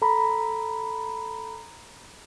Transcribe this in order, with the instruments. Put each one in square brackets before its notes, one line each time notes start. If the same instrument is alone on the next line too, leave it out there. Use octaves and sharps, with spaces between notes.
[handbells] A4 A#5 B5